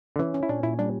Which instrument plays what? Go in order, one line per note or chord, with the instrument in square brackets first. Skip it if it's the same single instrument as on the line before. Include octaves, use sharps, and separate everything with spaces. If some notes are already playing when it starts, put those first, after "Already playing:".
[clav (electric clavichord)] D3
[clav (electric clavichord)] E3 [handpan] C#4
[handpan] C#4
[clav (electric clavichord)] E4
[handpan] A#2 [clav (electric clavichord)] D4
[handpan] A#2 [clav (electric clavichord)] E4
[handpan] G3 [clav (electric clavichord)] D4